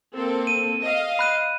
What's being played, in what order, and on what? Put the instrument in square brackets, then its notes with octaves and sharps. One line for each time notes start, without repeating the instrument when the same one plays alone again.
[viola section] A#3 C4 A4
[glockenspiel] D#7
[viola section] D#5 F5
[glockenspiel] B5 F#6 D#7